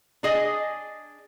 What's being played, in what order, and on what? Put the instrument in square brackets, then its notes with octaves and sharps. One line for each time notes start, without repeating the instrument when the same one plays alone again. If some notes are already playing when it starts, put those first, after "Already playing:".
[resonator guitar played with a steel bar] D4 G#4 D#5 G#5